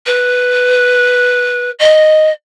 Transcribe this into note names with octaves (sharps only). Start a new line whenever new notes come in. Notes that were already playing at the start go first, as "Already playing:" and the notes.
B4
D#5